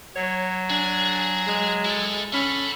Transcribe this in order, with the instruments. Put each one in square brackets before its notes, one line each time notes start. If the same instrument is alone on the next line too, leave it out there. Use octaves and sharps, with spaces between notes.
[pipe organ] F#3 [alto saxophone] C#5
[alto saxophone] D4 [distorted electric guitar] G#4 G#5
[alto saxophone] G#3
[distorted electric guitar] E4 A4
[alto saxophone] C#4 [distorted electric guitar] A4 F#5 [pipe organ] B5